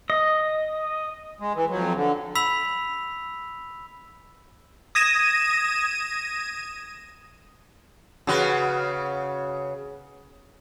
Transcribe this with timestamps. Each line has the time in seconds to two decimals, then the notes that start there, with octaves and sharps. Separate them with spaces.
0.10 D#5
1.40 G#3
1.55 E3
1.70 F2 F#3
1.95 D3
2.35 B5 E6 B6 F7
4.95 D#6 G#6 A#6 D#7 E7
8.27 C#3 F#4 B4